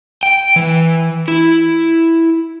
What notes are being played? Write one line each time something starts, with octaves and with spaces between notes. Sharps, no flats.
G5
E3
E4